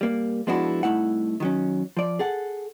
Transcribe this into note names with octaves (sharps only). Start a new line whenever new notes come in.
G3 A#3
F3 G#3 B3 D4 E4 F#4
C2 A2 A3 D#4 E4 F#5
D#3 F#3 C#4
F3 D5
G#4 A4 F#5